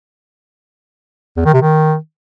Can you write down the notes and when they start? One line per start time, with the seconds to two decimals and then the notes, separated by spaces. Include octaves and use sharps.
1.37 E2
1.45 D#3
1.54 C3
1.62 D#3